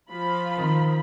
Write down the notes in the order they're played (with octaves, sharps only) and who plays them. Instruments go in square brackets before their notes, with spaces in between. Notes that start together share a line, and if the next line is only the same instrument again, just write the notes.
[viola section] F3 F4 B5
[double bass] D#3 C4